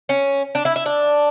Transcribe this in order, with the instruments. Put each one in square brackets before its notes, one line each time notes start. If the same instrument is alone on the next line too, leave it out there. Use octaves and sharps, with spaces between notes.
[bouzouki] C#4
D4
E4
E4
D4